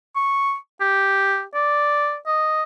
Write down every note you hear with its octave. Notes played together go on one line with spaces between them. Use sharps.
C#6
G4
D5
D#5